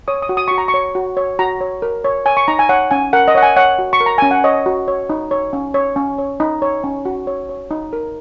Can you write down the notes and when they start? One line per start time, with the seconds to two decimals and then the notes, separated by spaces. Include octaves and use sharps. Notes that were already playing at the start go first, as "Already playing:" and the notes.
0.08 C#5 D#6
0.22 D#6
0.29 F#4
0.37 D#6
0.48 F#4 C#6
0.58 A#5
0.68 C#6
0.74 C#5
0.95 F#4
1.17 C#5
1.39 F#4 A#5
1.61 C#5
1.82 A#4
2.04 C#5
2.26 C#5 G#5
2.37 C#6
2.48 D#4 A#5
2.59 G#5
2.69 C#5 F#5
2.91 C#4 G#5
3.13 A#4 F#5
3.28 D#5
3.35 C#5 F#5
3.43 G#5
3.56 C#5 F#5
3.79 F#4
3.93 C#6
4.01 A#4
4.06 A#5
4.18 C#4 G#5
4.31 F#5
4.44 C#5 D#5
4.66 F#4
4.88 C#5
5.10 D#4
5.31 C#5
5.53 C#4
5.74 C#5
5.96 C#4
6.18 C#5
6.40 D#4
6.62 C#5
6.84 C#4
7.05 F#4
7.27 C#5
7.49 C#5
7.71 D#4
7.93 A#4